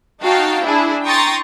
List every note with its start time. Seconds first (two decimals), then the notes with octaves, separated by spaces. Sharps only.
0.21 D#4 F#4 F5 G5 A5
0.63 D4 E4 G#4
1.05 G5 A#5 C6 C#6 D#6 A6